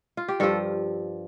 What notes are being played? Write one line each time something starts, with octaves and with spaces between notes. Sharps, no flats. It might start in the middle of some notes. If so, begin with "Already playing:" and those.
F4
G4
G2 F3 A4